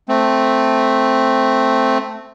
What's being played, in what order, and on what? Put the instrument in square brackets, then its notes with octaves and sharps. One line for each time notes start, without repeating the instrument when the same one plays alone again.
[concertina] A3 C4